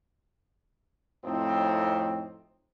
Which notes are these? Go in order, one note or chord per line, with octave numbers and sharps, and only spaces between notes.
F2 A2 C4 D#4